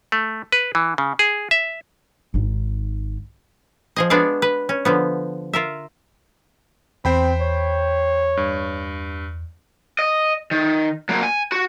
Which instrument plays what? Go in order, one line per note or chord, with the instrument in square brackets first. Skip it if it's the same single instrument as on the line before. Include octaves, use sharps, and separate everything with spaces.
[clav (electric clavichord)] A3
B4
E3
C#3
G#4
E5
[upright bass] G#1 D#4
[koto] F3 G#4 D#5
G#3 B3 D4 F#4 D5 F5
B4
C#4
D3 F3 B3
F4 A#4 E5
[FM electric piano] E2 [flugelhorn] C4 [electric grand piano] C5 G5 B5
[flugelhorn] C#5
[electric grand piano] G2
[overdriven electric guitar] D#5
D#3
F#3 A#3
G#5
F#4